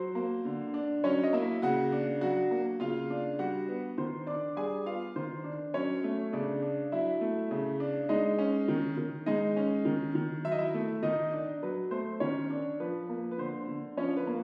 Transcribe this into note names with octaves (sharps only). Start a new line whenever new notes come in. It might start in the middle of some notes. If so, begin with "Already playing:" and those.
Already playing: F#3 C5
A#3
D3
D4
F#3 C#4 C#5
D#5
A#3 E4 E5
C#3 F#4 F#5
D4
F#3 F#4 F#5
A#3
C#3 F4 F5
D4
G3 F#4 F#5
B3
D#3 C5 C6
D4 D5 D6
G3 G#4 G#5
B3 F4 F5
D#3 C5
D4
F#3 C#4 C#5
A3
C#3 D4 D5
D4
F#3 E4 E5
A3
C#3
D4
G#3 D#4 D#5
C#4
D#3
D#3
G#3 D#4 D#5
C#4
D#3
D#3
F#3 E5
D#5
E4 E5
A3
D#3 D#4 D#5
D4
F#3 B4
A3 C5
D#3 C#4 C#5
D4
F3 B4
A#3
B4
D3 C5
D3
F3 C#4 C#5
B4
A#3